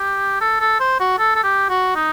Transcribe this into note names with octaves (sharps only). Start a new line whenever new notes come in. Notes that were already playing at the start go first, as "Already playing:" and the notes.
Already playing: G4
A4
A4
C5
F#4
A4
A4
G4
F#4
D#4